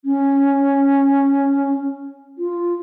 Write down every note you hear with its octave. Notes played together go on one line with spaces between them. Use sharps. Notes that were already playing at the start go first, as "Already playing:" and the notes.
C#4
F4